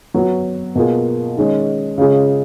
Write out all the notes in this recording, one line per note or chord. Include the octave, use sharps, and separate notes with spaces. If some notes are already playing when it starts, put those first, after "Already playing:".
F#3 B3 F#4
B2 A#3 F4 G#4
D#3 G#3 C#4
C#3 G#3 C#4 F4 G#4